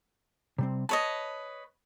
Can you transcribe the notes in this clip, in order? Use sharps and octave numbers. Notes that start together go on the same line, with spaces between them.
C3 G3 C4
B4 C#5 D#5 A5